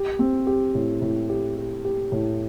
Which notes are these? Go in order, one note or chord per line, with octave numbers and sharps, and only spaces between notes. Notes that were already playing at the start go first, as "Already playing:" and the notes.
Already playing: G4
C4
G4
A2
A2
G4
G4
G4
A2